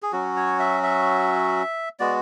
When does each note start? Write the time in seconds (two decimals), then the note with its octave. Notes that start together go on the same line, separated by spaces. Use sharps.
0.03 G#4
0.12 F#3 C#4 F#4
0.36 C#5
0.59 E5
0.83 E5
2.00 G#3 B3 F#4 D5